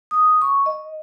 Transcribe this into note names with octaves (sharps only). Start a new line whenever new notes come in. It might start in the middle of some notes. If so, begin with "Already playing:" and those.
D#6
C#6
D#5